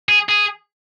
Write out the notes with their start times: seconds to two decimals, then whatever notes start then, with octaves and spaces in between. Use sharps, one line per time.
0.09 G#4
0.29 G#4